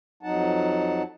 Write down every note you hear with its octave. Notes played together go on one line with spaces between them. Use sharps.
F2 F#3 D#4 F#5 A5